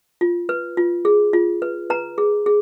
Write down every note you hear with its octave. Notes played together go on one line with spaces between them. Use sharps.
F4
B4
F4
G#4
F4
B4
B4 A#5
G#4
G#4